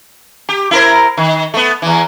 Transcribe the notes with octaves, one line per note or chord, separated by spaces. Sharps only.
G4
E4 A#4 C5
D#3
A3 B3
E2 E3